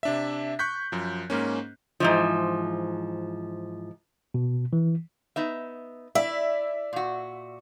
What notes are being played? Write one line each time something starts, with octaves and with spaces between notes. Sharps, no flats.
C3 D4 E5
C#6 F#6 G6 B6
F#2 F3
G#2 A#3 C#4
G#2 E3 F3
B2
E3
B3 D#4 E5
E4 D5 E5
A#2 F#4